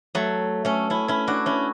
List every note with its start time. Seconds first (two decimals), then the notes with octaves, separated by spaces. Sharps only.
0.15 F#3 A3
0.65 A3 C#4
0.90 C#4 E4
1.08 C#4 E4
1.27 D4 F#4
1.46 C#4 E4